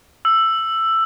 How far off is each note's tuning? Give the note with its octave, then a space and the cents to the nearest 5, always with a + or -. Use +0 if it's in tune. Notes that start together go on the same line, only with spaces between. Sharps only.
E6 +10